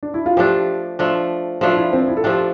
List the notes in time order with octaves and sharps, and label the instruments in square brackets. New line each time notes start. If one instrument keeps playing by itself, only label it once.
[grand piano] D4
E4
F4
[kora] F3 A3 D4 [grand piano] G4
[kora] F3 A3 D4
[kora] F3 A3 D4 [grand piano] F4
[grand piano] E4
C4
E4
A4
[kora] F3 A3 D4 [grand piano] G4